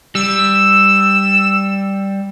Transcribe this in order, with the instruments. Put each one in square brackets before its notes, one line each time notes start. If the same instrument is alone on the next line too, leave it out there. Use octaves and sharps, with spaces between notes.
[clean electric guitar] G3 [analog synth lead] E6